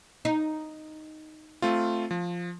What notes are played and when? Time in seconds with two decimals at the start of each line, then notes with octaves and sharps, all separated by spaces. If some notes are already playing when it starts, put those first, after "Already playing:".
0.25 D#4
1.62 A3 C4 F4
2.11 F3